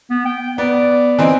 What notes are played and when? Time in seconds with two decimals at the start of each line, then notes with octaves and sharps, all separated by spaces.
0.10 B3
0.25 G5
0.58 B3 D5
1.19 E3 C4 D#4